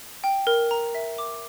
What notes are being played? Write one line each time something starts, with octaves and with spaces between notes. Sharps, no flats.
G5
A#4
A#5
E5
D6